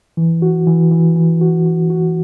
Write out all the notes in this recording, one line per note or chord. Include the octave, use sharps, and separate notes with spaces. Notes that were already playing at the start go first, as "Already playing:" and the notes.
E3
F#4
E3
E3
E3
F#4
F#4
F#4